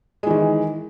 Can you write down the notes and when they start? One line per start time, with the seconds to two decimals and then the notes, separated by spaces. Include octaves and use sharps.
0.23 G#3
0.27 E3
0.30 D#3